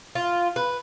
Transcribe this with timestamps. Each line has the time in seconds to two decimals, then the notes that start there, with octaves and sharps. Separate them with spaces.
0.15 F4
0.56 B4